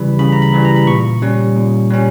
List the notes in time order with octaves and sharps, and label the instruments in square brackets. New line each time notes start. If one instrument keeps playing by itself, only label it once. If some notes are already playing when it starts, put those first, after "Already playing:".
Already playing: [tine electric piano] C#3 E3 G3 B5
C#3 B5
A#5
B5
E3 G3
A#5
B5
A#2 C#6
G3 C#4
A#2
G3 C#4